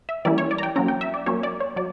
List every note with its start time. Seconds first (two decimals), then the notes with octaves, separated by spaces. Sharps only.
0.09 E5
0.25 E3 G3 A#3 C#4 E4 D5
0.38 C#5
0.51 D5
0.58 A#5
0.63 G5
0.76 F#3 A#3 C#4 A#5
0.88 G5
1.01 E5
1.14 D5
1.26 F#3 A#3 C#4 C#5
1.43 D5
1.61 C#5
1.76 F#3 D5